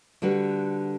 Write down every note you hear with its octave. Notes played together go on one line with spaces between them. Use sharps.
D3 G3 F#4 B4